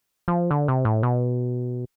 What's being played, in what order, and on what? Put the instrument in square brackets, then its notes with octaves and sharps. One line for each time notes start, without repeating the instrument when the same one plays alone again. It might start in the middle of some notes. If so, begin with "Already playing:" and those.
[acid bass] F3
D3
C3
A2
B2